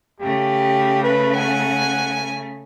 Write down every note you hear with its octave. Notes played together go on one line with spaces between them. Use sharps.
C#3 A3 G4
B4
F#5 G#5